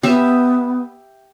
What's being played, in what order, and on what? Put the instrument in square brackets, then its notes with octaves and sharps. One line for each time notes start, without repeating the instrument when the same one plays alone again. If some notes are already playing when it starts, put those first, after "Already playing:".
[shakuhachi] B3 [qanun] G4 E5